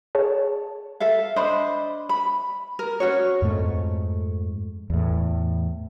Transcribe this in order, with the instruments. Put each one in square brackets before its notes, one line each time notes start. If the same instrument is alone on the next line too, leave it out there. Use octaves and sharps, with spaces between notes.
[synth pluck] G#4 C#5 A5
[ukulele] A4 E5 F5
D4 C5 D#5 B5
B5
A#4
C#4 F#4 C#5
[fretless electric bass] F2 G#2 A3
E2 A2